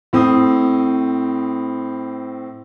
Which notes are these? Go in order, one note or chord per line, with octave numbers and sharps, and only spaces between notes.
A2 C4 D#6